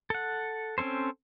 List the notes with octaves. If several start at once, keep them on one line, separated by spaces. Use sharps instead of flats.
A4 F#5
C4 C#4 A4 C5